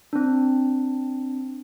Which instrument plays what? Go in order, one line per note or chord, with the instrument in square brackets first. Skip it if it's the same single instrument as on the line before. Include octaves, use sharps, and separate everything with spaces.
[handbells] C4 D4